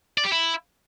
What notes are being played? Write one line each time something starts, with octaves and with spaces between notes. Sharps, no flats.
D5
G4
E4